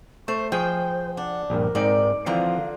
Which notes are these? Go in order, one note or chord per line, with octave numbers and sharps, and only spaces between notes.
A3 C5 C#6
F3 G#4 C5 G5 G#5
D4 F#5
A#1 G2 A#4
G#2 C4 D#4 D5
D3 E3 F3 C4 F4 F5 A#5